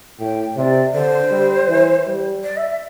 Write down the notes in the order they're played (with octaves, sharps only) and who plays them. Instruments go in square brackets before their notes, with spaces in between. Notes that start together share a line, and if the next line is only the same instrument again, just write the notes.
[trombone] A2 [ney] G5
[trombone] C3 [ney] D5
[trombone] D3 [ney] C5
[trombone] G3
E3
G3
[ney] D5
E5
E5